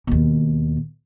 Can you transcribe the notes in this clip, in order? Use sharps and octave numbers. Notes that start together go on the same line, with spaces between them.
D#2 B2